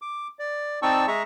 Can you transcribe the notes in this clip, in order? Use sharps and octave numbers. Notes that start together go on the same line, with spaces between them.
D6
D5
C4 D#4 D5 A5 C#6 E6
G#3 G#4 E5 A#5 C#6